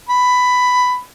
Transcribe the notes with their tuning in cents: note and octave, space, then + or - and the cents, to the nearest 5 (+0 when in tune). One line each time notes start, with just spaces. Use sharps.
B5 +10